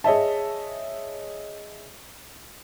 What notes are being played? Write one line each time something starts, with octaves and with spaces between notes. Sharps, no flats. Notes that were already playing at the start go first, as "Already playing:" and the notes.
G#4 C#5 D#5 E5 A5